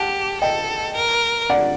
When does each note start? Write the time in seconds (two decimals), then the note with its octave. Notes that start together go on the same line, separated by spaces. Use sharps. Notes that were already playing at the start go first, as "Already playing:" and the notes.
Already playing: G4 F#5 A5
0.41 A4 D#5 G5
0.96 A#4
1.50 D5 F#5